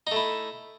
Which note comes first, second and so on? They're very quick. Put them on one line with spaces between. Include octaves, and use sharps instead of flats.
D#4 A3 E4